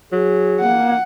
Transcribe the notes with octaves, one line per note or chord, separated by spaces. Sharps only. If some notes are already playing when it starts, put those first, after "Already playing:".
F#3 G#4
A#3 F#5